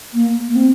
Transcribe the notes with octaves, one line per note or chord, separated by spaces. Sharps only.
A#3
A#3
C4